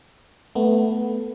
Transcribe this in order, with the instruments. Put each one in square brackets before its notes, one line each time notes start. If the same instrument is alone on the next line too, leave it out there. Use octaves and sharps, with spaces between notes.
[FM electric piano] A3 B3